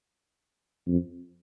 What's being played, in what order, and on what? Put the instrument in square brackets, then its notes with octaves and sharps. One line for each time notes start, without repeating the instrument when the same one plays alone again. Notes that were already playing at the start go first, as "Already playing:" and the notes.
[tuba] F2